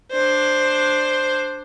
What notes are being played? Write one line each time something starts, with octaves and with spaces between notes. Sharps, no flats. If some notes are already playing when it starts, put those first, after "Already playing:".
D4 C5